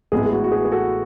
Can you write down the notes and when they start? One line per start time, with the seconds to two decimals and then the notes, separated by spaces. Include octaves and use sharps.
0.12 A1 A2 G#3 B3 G#4
0.26 G#4
0.33 F#4
0.44 F#4
0.52 G#4
0.65 G#4
0.72 F#4 A4